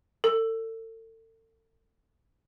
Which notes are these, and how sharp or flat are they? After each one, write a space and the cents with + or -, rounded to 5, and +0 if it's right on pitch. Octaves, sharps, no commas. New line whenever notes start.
A4 +35